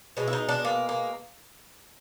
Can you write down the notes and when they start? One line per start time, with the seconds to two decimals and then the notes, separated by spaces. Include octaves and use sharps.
0.17 B2 G#3
0.28 E4
0.33 D#4
0.49 D4
0.65 A#3
0.89 A#3